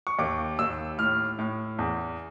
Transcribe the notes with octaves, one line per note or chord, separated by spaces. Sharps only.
C#6
D#2 D6
D#2 E6
A2 F6
A2
E2